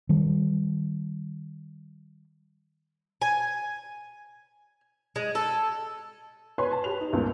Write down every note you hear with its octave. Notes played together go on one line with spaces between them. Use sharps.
D#3 G3
G#5
G#3
A4
B4 C#5 G#5 C6
A5
G4 B4 F7
D#4
C#2 G2 A#2